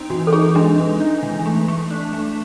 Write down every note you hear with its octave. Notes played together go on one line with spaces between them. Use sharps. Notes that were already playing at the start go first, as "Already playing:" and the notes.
Already playing: C4 D#4
E3 F#4
A4
D#4 G#4
G#3 D4
E3
D#4
E3
A3
A3
D4
A3